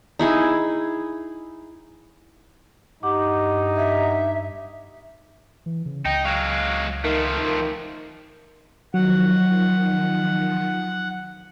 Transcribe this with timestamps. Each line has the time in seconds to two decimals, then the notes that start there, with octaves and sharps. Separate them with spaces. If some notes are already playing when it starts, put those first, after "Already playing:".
0.19 D#4 E4 G#4
3.03 G2 D#4 G4 F#5 D6
3.76 E5
5.66 E3
5.86 C#3
6.05 C#2 D#4 G5
6.25 F#3 G#3 F5
7.04 D#3 F3 A3 F5
7.38 D#3
8.94 D#3 F3 F#3 F#5